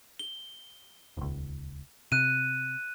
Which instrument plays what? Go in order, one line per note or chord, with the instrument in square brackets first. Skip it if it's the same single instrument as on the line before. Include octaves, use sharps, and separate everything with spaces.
[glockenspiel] G7
[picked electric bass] D#1 C#2
[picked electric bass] C3 [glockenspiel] F#6 D#7